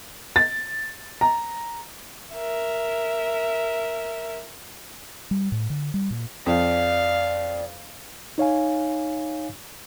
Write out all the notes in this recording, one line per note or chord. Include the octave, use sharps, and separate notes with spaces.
A6
A#5
A#4 E5
G3
A2
D3
G3
A#2
F2 D5 F5
D#4 C#5 F5 G#5